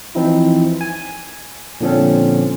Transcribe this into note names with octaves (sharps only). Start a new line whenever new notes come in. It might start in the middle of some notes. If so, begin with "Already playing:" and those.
E3 F3 C4 D#4 E4
G#5
A#2 D3 F3 C4 C#4